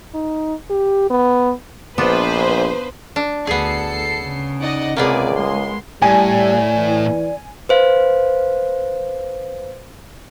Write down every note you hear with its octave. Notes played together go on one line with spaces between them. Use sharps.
D#4
G4
B3
A#1 B3 D4 F4 B4 C5
D4
D2 B3 G#4 A4 C7 C#7
C#3
D#4 D5 D#5 F#5
C#2 C3 A#3 B3 G#4 D5 G#5
G#3 C6
A2 G3 D5 G#5
E3
B4 C5 F5